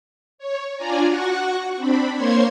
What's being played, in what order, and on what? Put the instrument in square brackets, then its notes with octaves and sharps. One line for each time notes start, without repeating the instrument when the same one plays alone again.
[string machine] C#5
D4 F4 D5 G#5 A#5
F#4 F#5 C#6 F#6
C4 D4 B5
A#3 C5 C#5 C6 G#6